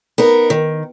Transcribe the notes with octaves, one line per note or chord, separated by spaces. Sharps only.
B3 D#4 A#4
D#3